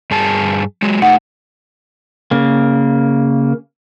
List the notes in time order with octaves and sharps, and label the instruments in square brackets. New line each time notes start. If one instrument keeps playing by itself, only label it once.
[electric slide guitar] G2 G#4 A5
F#3 G#3
[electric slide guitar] A3 D#4 [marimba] F#5
[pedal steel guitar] C#3 A#3